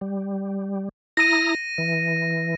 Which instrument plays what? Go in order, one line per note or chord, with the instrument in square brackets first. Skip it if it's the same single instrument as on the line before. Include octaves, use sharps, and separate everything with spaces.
[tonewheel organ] G3
[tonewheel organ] E4 A#5 D#6 [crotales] A#6 D#7
[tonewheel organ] E3